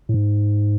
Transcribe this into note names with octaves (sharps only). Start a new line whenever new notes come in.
A2
G#2